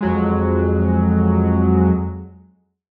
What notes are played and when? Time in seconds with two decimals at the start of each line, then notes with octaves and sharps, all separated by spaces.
0.01 F2 F#3 G#3